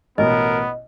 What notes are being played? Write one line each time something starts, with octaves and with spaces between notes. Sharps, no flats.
A1 B2 B3 A#4 D#5